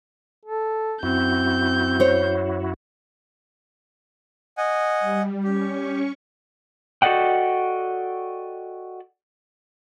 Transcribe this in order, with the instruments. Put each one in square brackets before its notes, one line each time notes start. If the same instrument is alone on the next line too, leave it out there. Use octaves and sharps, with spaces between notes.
[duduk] A4
[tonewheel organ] F#2 E4 F#4 [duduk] C4 [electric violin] G6
[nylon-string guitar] C5 C#5
[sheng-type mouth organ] D#5 F#5 G#5
[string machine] G3
[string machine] C#4 C#6 [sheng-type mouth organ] G4
[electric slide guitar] F#4 A4 D5 D#5 F#5 G5